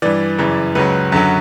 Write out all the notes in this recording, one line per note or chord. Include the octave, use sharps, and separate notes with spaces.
G2 E3 D5
F#2 C#3 E3
C#2 C#3 F#3 B4
F#2 D3 F#3